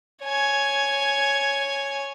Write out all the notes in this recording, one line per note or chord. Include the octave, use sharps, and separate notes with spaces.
C#5 G#5